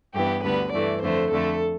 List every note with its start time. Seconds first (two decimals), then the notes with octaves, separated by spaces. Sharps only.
0.14 G2 E3 B3 G4
0.44 D2 D3 G3 B3 B4
0.73 G2 E3 A3 D5
1.02 F2 D3 A3 C5
1.31 F2 D3 A3 A4